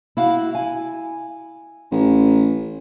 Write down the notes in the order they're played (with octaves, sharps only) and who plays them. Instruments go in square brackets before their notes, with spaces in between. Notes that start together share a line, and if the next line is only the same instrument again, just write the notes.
[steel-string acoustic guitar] E4 F#4 F5
G#5
[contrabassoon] A1